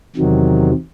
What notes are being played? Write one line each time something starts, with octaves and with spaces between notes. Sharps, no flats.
E2 C3 D#3 F#3